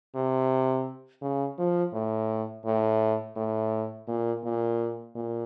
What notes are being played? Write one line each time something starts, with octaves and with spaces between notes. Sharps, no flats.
C3
C#3
F3
A2
A2
A2
A#2
A#2
A#2